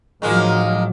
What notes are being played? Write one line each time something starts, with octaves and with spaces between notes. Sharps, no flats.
A2 D#3 F3 F#3 G#3 A#3